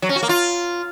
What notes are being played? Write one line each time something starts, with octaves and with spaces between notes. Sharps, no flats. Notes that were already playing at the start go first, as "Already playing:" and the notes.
F#3
C#4
F#4
A#3
F4